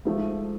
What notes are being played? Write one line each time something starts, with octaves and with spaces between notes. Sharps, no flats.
G#2 F3 A3